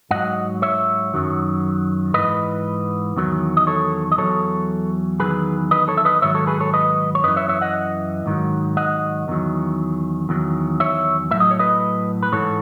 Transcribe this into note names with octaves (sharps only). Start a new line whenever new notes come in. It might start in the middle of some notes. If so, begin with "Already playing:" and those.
G#2 F#3 D#5 F#5
C#5 E5
F#2 D#3 F#3
G#2 E3 B4 D#5
E2 D#3 F#3
D#5
A4 C#5
D#5
E2 C#3 F#3 A4 C#5
E2 D#3 F#3 G#4 B4
B4 D#5
A4 C#5
E5
B4 D#5
G#2 D#3 F#3 C#5 E5
A4 C#5
G#4 B4
A4 C#5
B4 D#5
C#5
F#2 E3 B4 D#5
C#5 E5
C#5 E5
D#5 F#5
G#2 D#3 F#3
D#5 F#5
E2 D#3 F#3
E2 D#3 F#3
C#5 E5
A2 F#3 E5
D#5
C#5
B4 D#5
B4
G#2 E3 A4 C#5